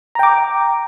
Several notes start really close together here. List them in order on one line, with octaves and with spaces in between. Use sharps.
A#5 G5 D6